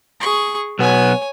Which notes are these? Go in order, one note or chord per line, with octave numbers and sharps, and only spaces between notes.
G#4 C#6
B1 B3 C#5 G#5